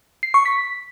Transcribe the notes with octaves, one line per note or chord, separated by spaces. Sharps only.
C7
C#6
B6